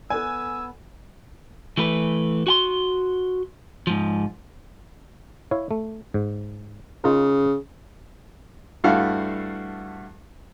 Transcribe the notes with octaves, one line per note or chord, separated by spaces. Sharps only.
B3 A4 D5 G#5 E6
E3 A3 B4
F#4 G5 C6
G#2 F3
E4 C#5 F5
A3
G#2
C#3 D#4 F4 A#4
G2 A3 E4 F#4 A4 F5